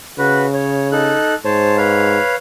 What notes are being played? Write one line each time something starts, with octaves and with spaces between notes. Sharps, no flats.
C#3 F#4 B4
C#5
D#4 A4 F#6
G#2 C5 C#5 A5
B4 C#5 F5